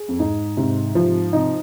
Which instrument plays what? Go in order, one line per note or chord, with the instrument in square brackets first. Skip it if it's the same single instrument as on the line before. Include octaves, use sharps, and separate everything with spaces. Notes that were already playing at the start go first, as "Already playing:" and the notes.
Already playing: [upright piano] G#4
[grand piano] F2
[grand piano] G#2 [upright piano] D#4
[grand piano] G#2 [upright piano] C3
[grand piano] G#2 [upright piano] F3
[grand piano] C3 [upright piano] D#4